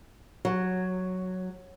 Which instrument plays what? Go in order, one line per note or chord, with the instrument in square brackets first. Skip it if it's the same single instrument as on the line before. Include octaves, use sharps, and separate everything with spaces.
[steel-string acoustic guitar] F#3